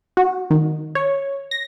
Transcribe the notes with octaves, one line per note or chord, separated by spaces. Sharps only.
F#4
D#3
C#5
A#6